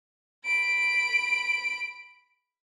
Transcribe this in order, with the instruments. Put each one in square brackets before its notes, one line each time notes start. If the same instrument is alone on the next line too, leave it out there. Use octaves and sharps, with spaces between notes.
[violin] B5 D7